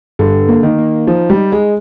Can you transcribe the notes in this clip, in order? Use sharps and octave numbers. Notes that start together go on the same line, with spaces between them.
G2 D3
A#3
D#3
A#3
F3 D#4
G3
D#4
G#3